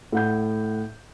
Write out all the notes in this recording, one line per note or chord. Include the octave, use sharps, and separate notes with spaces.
A2 F#5 G6